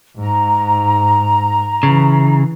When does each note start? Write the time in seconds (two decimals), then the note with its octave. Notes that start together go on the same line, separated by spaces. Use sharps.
0.19 G#2 A#5
1.83 C#3 E3